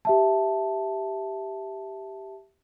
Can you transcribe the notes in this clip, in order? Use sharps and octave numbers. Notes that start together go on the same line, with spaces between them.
G4 E5 A5